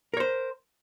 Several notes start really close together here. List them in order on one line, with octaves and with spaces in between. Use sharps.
A#4 C#5 C5